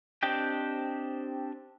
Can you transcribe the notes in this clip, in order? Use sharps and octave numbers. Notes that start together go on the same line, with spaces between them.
C4 D4 G4 D#5 G5